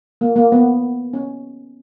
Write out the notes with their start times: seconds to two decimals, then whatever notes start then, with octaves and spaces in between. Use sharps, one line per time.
0.21 A#3
0.36 A#3
0.52 B3
1.13 C#4